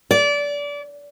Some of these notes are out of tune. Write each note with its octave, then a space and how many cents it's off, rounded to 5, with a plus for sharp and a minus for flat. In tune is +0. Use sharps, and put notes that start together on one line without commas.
D5 -25